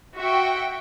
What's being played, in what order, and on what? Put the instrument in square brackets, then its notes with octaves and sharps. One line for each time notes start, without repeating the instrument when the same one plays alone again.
[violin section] F#4 E5 G5